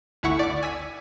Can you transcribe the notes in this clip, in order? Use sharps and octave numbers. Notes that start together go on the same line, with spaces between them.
G1 D2 E4 F#5 C#6
D5 D6
G#5 E6 B6 D#7